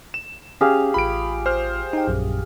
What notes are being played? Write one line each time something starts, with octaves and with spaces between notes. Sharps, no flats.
E7
C#4 G4 G#4 F5
A1 F4 B5 D7
C5 F6
D#4 G5
A#1 F#2 A#2